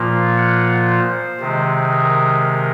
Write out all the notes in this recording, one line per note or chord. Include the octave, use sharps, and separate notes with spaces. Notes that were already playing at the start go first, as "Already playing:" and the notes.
Already playing: A#2 F3 A#3 F4
F#5
C5
C3 D#3 G#3
A#4
A#4